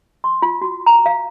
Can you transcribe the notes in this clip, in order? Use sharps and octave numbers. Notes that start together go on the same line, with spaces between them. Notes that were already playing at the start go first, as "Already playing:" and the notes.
C6
F4
F#4
A#5
F5